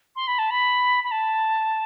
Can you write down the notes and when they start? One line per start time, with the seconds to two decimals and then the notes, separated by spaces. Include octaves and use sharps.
0.15 C6
0.27 B5
0.38 A5
0.50 B5
1.03 B5
1.11 A5